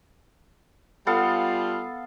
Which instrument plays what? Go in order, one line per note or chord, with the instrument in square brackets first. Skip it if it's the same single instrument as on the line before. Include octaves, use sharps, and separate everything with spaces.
[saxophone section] G3 F4 [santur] B3 A4 F5